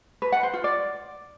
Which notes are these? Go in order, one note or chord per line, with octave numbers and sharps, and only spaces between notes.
B4
F#5
C5
F4
D5